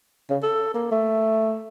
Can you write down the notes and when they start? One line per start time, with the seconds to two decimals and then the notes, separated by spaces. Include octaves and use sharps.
0.30 C#3
0.43 A4
0.74 A#3
0.92 A3